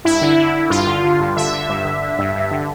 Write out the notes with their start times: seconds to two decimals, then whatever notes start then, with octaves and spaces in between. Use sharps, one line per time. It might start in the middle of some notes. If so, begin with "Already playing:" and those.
0.05 G2 E4
0.22 D3
0.38 D3
0.55 D3
0.70 G2 F4
0.87 D3
1.04 D3
1.20 G2
1.36 D3 E5
1.53 D3
1.69 G2
1.85 D3
2.02 D3
2.19 G2
2.35 G2
2.51 D3